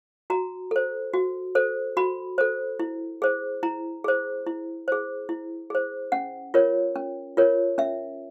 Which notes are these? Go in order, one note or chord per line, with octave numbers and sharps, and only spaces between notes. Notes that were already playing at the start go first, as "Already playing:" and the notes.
F#4 A#5
A4 C5
F#4
A4 C5
F#4 B5
A4 C5
E4
G#4 C5
E4 A#5
G#4 C5
E4
G#4 C5
E4
G#4 C5
C#4 F#5
F4 A#4 C#5
C#4
F4 A#4 C#5
C#4 E5